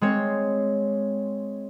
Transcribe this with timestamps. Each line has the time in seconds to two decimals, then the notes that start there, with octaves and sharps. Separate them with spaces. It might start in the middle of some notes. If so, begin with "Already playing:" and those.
0.01 G#3 C4 C#5